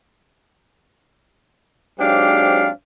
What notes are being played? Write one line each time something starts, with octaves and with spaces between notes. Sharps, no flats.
G#2 F#3 C4 D4 G4 F5